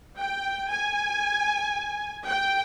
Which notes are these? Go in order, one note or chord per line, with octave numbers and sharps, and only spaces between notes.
G5
G#5
G5